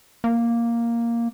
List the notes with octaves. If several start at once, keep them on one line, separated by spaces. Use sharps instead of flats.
A#3